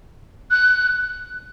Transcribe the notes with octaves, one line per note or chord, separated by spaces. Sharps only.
F#6